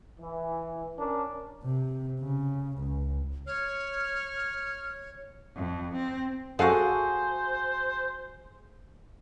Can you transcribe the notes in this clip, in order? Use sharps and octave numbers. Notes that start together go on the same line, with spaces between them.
E3
C#4 D4 A#4
C3
C#3
C#2
C#5 F6
F2
C4
F#2 F#4 G#4 A4 C5 F5 F#5